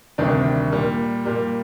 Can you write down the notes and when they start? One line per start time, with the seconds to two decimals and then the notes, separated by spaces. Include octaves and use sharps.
0.18 D2 C3 D#3 G3 D4
0.71 A#2 G3 A#3
1.24 A#2 G3 A#3